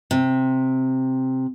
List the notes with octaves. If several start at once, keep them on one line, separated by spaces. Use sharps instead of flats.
C3